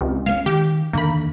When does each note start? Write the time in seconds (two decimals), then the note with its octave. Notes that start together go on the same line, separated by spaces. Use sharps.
0.01 C#2 C3
0.26 G#3 A#3 C#4 F5
0.46 D#3 G4
0.93 E2 D3 D#3 A#3 B5